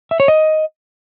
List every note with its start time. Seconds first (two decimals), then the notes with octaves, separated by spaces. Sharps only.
0.11 E5
0.20 C#5
0.28 D#5